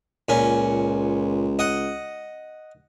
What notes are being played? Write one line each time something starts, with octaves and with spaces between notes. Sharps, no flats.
C#2 A#2 C#4
D#5 F#5